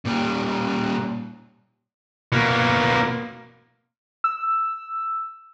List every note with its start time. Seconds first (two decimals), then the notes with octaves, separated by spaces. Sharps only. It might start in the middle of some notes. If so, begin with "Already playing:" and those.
0.05 A#2 G3
2.32 B2 A#3
4.24 E6